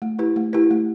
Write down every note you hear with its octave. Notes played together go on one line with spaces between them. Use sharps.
A3
E4 G4 B4
A3
E4 G4 B4
A3